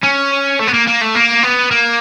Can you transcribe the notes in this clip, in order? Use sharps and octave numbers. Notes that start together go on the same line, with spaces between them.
C#4
A3
B3
A#3
A#3
A3
A#3
B3
A#3